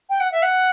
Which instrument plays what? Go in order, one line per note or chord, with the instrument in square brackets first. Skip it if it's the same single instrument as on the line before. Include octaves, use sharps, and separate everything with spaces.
[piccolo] G5
F#5
E5
F#5